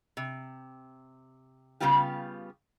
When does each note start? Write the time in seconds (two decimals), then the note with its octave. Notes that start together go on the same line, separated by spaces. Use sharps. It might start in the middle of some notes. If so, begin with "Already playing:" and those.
0.17 C3
1.80 C#3 F3 G3 B3 F4 G4